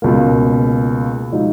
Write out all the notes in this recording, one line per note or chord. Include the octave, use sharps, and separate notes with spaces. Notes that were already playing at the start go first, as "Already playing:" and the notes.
C#2 B2 A#3
F3 G#3 D#4 F#4